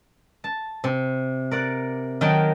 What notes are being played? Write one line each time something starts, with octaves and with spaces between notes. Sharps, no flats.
A5
C3
A#4 D5 F#5
D#3 F#3 A#4 G5 A5